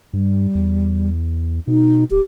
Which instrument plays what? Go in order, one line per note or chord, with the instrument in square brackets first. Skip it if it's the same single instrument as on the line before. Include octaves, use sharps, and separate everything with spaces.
[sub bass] G2 [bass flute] G3
[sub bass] E2
[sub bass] B2 [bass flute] D#4
[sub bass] D1 [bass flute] G4